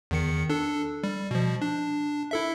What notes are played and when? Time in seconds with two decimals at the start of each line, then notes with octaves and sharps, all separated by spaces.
0.11 E2 D#3 C#7
0.50 D4 A4
1.04 G3
1.31 B2 F3
1.62 D4
2.31 E4 A4 E5